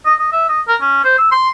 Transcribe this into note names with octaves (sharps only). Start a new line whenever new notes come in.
D#5
D#5
E5
D#5
A#4
C#4
C5
E6
C6